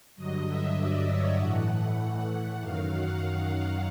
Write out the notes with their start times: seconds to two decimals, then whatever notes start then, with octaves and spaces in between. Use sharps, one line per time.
0.16 G2 D3 F#3 D#5
0.46 E5
0.77 D5
1.08 C#5
1.38 A2 E3 A3 F#5
2.60 F#2 D#3 F#3 F5
2.91 F#5